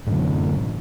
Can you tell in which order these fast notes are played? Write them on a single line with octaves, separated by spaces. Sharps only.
A2 F#2 D3